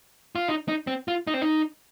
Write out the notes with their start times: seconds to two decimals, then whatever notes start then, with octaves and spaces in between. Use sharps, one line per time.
0.35 F4
0.48 D#4
0.68 D#4
0.87 C4
1.08 F4
1.27 D#4
1.34 C4
1.42 D#4